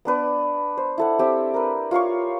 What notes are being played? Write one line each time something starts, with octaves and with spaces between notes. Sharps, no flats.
B3 D4 B4 D5
C5
E4 A4 F#5
C4 G4 E5 G5
A#4 B4
F4 C#5 F5 C#6